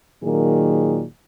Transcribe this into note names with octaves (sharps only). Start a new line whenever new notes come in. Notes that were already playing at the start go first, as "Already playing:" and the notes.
A#2 D#3 F#3 A#3 G#4